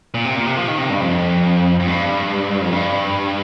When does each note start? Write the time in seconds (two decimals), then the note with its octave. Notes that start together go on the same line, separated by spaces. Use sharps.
0.14 A#2
0.25 C3
0.36 A#2
0.46 C3
0.57 F3
0.68 D#3
0.78 C3
0.90 G2
1.01 F2
1.80 F2
1.87 G2
2.62 F2
2.73 G2